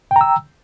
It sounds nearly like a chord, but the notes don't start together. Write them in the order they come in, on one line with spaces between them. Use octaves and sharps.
G5 A#5 E6